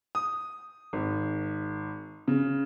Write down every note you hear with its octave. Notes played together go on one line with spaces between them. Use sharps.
D#6
G#1
C#3